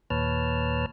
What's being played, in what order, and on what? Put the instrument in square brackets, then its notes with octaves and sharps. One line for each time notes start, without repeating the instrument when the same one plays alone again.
[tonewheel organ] D#2 A#2 B4 C#5 A5 F6